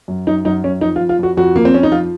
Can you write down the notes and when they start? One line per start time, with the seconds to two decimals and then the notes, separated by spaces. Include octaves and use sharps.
0.08 F#2
0.27 F#2 D#4
0.45 F#2 D#4
0.64 F#2 C#4
0.81 F2 D#4
0.96 F4
1.01 F2
1.09 F4
1.19 F2 F#4
1.37 F2 F#4
1.56 F3 A#3
1.65 C4
1.74 F2 C#4
1.83 D#4
1.92 F3 F4